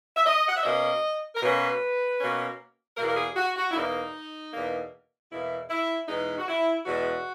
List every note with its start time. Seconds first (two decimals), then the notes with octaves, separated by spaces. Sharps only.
0.16 E5
0.25 D#5
0.48 F#5
0.57 E5
0.64 B2 A#3 C#4 D#5
1.35 A#4
1.41 B2 A#3 C#4 B4
2.20 B2 A#3 C#4
2.97 E2 B2 A#3 A#4
3.10 A#4
3.17 G#4
3.36 F#4
3.56 F#4
3.71 E4
3.75 E2 B2 A#3 D#4
4.53 E2 B2 A#3
5.31 E2 B2 A#3 E4
5.69 E4
6.08 E2 B2 G#3 D#4
6.39 F#4
6.48 E4
6.86 E2 B2 G#3 F#4